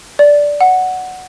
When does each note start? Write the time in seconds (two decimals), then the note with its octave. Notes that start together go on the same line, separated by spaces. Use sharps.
0.19 D5
0.61 F#5